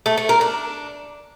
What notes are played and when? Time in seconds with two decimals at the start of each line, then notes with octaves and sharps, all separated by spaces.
0.06 A3
0.17 A3
0.29 A#4
0.41 D4